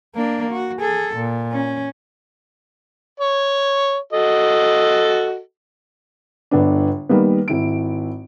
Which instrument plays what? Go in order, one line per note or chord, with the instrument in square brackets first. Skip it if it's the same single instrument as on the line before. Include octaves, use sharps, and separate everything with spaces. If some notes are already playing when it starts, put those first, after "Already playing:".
[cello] A#3 D4
F#4
G#4 A4
A#2
C#4
[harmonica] C#5
F#4 A4 D#5
[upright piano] G1 B3 D4
D#3 G3 A#3 B3
G#1 E4 D7